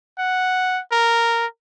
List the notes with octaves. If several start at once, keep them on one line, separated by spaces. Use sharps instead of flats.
F#5
A#4